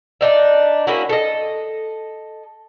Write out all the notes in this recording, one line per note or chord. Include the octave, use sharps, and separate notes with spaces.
D4 D#4 E5
A#3 C#4 E4 F#4
A4 D#5